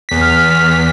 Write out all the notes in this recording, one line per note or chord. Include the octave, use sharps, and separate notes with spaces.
E2 B6
F6